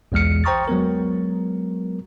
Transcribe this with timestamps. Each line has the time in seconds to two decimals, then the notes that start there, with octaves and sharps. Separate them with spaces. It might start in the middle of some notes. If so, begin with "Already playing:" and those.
0.12 B1 E2 G#3 F6 C#7
0.44 C5 G5 A#5 C#6 D#6 A6
0.68 F#3 G#3 B3 A#4